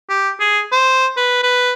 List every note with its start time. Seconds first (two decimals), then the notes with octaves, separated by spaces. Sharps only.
0.09 G4
0.40 G#4
0.72 C5
1.17 B4
1.43 B4